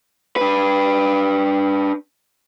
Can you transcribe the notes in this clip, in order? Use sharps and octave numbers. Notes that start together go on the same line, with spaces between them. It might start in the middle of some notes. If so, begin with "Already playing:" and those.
D4 B4